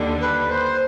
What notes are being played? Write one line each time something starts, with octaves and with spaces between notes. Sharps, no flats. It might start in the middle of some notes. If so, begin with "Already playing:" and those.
Already playing: D#2 D3 G3
B4
C5